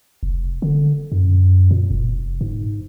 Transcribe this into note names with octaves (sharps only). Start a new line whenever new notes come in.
F1
D3
F#2
A#2
F1
G#2